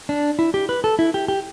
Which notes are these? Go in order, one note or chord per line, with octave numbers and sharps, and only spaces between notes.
D4
E4
G4
B4
A4
E4
G4
G4